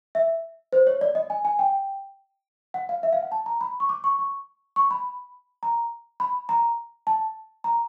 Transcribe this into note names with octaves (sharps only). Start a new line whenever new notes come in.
E5
C5
C#5
D5
D#5
G#5
G#5
G5
F#5
F5
E5
F5
F#5
A5
A#5
B5
C#6
D6
C#6
C#6
C#6
B5
A#5
B5
A#5
A5
A#5